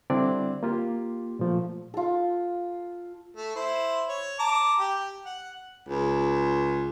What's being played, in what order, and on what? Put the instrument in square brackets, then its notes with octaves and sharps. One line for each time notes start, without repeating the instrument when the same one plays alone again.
[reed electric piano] D3 G3 C4 D4 E4 D5
A#3 F4 G4
A#2 F3 A3
[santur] F4 A4
[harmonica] A3
E4 C5
C#5
A5 A#5 D6
G4
F#5
[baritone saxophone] C#2